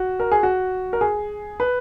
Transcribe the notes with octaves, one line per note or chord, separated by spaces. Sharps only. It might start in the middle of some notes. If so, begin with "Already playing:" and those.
Already playing: F#4
A#4
G#4
F#4
A#4
G#4
B4